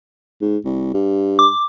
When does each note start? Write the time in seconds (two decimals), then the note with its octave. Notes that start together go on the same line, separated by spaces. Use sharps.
0.41 G#2
0.65 C2
0.94 G2
1.39 D6